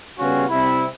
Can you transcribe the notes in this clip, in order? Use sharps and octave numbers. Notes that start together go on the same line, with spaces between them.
C#3 G3 B3 C#4 F4 F#4
C3 G3 C4 E4